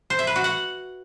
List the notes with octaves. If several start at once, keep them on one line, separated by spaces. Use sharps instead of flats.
C5
E5
B4
F#4
F#5